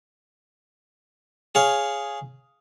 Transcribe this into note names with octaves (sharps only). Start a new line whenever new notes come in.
G#4 C#5 F5